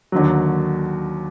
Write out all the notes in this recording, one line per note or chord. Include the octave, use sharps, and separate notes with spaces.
D#2 D3 F#3